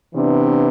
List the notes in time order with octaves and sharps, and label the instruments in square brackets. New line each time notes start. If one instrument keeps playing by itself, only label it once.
[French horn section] C3 E3 B3 D4